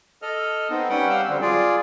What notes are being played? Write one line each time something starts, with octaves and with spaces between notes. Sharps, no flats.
A4 D#5 F6
B3 C4 D#4
G3 C#4 B4 F#5 G5
G4 F5 F#5 E6 G6
D3 F#3 G3 C4
F4 G#4 D5